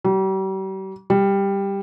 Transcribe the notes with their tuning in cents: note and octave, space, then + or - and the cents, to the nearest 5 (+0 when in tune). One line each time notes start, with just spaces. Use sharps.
G3 -40
G3 +10